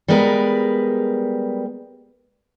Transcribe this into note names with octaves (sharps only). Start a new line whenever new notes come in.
G3 G#3 B3 A#4 B4